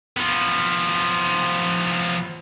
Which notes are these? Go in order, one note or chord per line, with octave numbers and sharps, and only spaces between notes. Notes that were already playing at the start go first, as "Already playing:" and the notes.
F3 B3